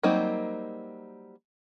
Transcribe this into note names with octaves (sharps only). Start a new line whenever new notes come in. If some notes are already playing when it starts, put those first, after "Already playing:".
F#3 G3 A#3 C4 D#4